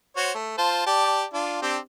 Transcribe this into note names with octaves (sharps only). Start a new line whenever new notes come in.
F#4 C5 C#5
A3
F4 C5 A5
G4 D5 A5
D4 F4
C4 D4 G4